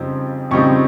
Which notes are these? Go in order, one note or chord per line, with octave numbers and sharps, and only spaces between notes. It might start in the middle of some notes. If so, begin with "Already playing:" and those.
Already playing: F2 C#3 G3 C4 D#4
F2 C#3 G3 C4 D#4 C#6